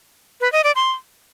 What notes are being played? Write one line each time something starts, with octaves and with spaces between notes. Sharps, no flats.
B4
D#5
D5
C6